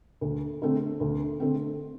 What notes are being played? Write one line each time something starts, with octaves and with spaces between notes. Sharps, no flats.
D2
D3 A3 C4
D2
D3 A3 C4